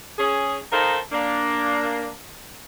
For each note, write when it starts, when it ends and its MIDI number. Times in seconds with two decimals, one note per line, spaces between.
0.19 0.57 61
0.19 0.57 68
0.72 0.99 51
0.72 0.99 63
0.72 0.99 69
0.72 0.99 70
0.72 0.99 72
0.72 0.99 77
1.12 2.11 58
1.12 2.11 62